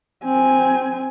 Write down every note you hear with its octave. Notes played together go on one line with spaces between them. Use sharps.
C4 G#5